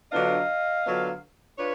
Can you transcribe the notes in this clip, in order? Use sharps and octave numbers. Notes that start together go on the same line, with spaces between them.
D3 F#3 B3 D4 F4 D#5 F5
D3 F#3 B3 D4 F4
D4 F4 B4 C#5